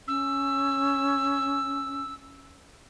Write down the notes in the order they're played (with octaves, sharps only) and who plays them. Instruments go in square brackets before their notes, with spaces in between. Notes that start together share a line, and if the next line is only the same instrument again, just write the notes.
[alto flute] C#4 [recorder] E6